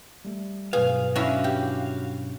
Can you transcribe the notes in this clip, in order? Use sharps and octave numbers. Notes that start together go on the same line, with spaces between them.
G3 A3
G2 B2 F#3 G#4 B4 F5
C#4 D4 E4 F#4 F5
G4